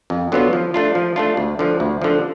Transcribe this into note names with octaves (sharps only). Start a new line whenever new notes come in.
F2
D3 F#3 B3 F4
F3
A3 D4 F4
F3
A3 D4 F4
D2
D3 F3
D2
D3 F3